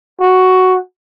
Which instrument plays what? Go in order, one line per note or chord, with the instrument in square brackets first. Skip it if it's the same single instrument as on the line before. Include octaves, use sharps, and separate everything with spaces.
[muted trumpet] F#4